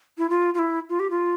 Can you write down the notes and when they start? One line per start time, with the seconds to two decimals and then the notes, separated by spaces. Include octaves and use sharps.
0.18 E4
0.30 F4
0.54 F4
0.59 E4
0.89 F4
1.00 G4
1.10 F4